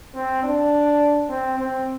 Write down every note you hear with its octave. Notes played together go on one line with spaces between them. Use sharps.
C4
D4
C4
C4